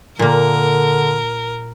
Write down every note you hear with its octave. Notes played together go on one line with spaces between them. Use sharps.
A#2 D3 A#3 A#4